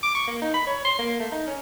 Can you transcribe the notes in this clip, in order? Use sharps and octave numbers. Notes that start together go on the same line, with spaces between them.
D6
C#6
A#3
D#4
B5
C#5
C6
A#3
A3
D#4
C#4